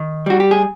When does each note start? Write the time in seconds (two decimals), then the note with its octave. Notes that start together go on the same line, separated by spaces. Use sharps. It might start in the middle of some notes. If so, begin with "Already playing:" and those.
Already playing: D#3
0.26 G3 F#4
0.40 G4
0.51 G#4